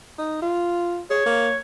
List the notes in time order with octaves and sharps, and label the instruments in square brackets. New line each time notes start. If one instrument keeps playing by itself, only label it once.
[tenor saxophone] D#4
F4
[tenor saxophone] G#4 [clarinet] C#5
[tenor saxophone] A#3